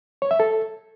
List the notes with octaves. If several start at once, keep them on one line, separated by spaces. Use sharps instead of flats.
C#5
E5
A4